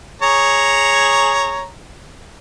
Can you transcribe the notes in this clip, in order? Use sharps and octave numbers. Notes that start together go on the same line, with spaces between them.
G#4 C#5 A#5